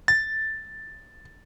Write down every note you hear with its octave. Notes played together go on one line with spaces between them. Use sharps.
A6